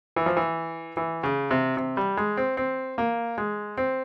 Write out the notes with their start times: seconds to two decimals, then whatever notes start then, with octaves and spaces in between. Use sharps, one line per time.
0.16 E3
0.26 F3
0.37 E3
0.97 E3
1.23 C#3
1.51 C3
1.77 C3
1.97 G3
2.17 G#3
2.37 C4
2.57 C4
2.98 A#3
3.38 G#3
3.77 C4